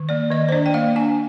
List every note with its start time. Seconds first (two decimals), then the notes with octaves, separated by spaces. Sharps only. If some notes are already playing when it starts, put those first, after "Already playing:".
Already playing: D#3
0.09 A#3 D5
0.30 D#3 D#5
0.49 C5
0.52 D4 D5
0.66 G5
0.74 A#3 F5
0.96 D4 G#5